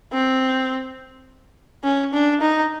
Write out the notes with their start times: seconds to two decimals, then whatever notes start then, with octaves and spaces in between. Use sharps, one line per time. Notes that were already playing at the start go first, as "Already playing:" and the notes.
0.13 C4
1.84 C#4
2.14 D4
2.42 D#4